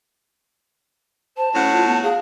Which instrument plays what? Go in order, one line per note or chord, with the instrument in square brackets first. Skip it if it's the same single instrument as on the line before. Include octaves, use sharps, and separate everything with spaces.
[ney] C5 [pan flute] A5
[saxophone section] A2 F#3 F#5 [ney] C#4
[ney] F4
B3
[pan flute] G#4 [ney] F5